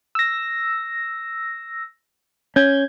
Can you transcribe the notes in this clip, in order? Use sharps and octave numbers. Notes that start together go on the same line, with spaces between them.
E6 A#6
C#4 G6 G#6